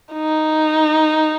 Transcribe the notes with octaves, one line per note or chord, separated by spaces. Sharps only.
D#4